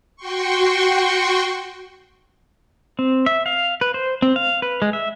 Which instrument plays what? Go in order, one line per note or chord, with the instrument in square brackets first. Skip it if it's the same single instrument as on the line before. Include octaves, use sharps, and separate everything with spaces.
[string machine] F#4 G5 C6 C#6
[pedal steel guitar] C4
E5
F5
B4
C5
C4
F5
B4
G#3
E5